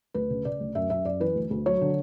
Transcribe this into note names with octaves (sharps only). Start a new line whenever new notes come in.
D2 B4
C#3
C#3 D5
D2
F#2 E5
F#2 E5
F#2 D5
E3 B4
D2
D2
F#3 C#5
D3